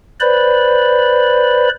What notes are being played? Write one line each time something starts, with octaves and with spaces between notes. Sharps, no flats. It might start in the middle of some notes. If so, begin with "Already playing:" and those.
B4 C5 D5 B5